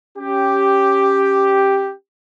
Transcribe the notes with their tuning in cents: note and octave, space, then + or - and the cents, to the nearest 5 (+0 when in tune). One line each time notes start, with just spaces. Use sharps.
C#4 +0 G4 +0